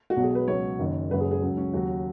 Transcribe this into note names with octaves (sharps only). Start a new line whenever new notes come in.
F#4
B1 B2 F#3
G#4
B4
C#2 B2 F#3 C#5
F#1 F#2 D#3
F#1 F#2 C#3 F#3 B4
G#4
G#4
C#2 C#3 F#3
C#4
D#2 C#3 F#3 F#4